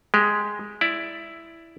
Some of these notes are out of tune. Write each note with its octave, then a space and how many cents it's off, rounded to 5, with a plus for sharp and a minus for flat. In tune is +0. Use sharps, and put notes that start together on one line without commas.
G#3 +0 G4 +5
E4 +5 D5 +0